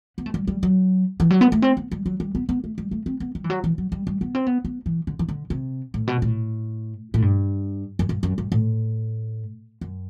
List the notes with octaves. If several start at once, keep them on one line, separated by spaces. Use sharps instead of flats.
B3
A3
G3
G3
F#3
E3
F#3
B3
A3
C4
B3
G3
F#3
G3
B3
B3
A3
G3
A3
C4
B3
G3
E3
F#3
E3
F#3
G3
G3
B3
C4
B3
B3
E3
D3
E3
D3
C3
A2
B2
A2
A2
G2
F#2
G2
F#2
G2
A2
F#2